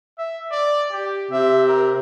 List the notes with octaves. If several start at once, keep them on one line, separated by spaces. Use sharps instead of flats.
E5
D5
G4
C3 E5
A#4